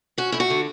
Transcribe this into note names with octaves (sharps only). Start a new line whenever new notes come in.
C#4 F#4
A3 E4
F#4
D3